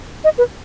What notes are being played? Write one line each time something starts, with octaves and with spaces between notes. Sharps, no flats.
D#5
B4